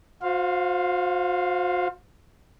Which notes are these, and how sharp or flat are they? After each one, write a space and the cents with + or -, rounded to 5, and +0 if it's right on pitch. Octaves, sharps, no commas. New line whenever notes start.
F#4 -45 C5 +0 F5 +0